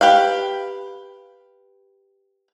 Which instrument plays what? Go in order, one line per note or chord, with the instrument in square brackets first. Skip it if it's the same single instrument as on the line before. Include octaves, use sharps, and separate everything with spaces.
[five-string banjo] G4 B4 F5